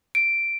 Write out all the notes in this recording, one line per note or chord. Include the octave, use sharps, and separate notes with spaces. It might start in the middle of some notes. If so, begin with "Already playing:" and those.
D7